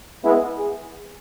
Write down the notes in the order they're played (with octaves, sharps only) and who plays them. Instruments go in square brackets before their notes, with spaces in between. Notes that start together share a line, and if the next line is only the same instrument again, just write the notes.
[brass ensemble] G#3 B3 [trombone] E4
[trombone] G#4